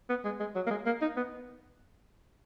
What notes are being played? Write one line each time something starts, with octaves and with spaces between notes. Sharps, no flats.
B3
G#3
G#3
F#3
A#3
G#3
A#3
D#4
B3